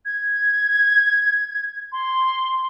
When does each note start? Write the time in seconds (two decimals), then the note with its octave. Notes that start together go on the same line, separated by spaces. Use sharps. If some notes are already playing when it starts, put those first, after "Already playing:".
0.05 G#6
1.92 C6